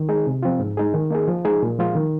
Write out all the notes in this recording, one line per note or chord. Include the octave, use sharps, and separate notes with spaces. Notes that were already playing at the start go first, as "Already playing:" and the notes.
Already playing: D#3
G#3 D#4 G#4
C3
F3 C4 F4
G#2
G#3 D#4 G#4
D#3
A#3 D#4 G#4
F3
G#3 D#4 G#4
A#2
F3 G#3 F4
D#3